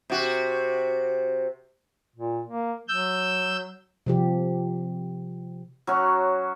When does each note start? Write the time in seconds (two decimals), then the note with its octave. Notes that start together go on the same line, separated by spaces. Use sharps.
0.10 C3 F#4
2.16 A#2
2.46 A#3
2.89 F#3 E6 G6
4.06 C3 F3 G4
5.87 F#3 C#4 F#4